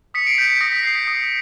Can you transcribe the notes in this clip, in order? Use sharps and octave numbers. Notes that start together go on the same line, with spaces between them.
D#6 B6 C#7
C7 D7
G6 B6 C#7
B6
D#6 A#6
B6
G6 C7
B6
D#6